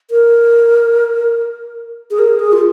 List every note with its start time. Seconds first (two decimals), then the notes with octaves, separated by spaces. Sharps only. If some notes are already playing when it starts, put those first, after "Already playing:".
0.11 A#4
2.11 G#4
2.19 A#4
2.39 G#4
2.53 F4